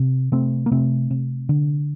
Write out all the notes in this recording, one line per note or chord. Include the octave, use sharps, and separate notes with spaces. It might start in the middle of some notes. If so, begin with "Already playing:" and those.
Already playing: C3
C3 A3 C4
A#3
C3 A3 C4
C3
D3